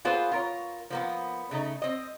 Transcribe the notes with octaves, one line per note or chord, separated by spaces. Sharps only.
A#3 B3 F4 G#4 B4 C5
F4 A#4 C#5
F3 A#3 B3
C#3 A3 D#4
C4 D#5